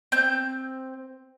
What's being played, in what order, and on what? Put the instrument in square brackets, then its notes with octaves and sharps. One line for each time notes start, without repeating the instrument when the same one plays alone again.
[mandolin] C4 G6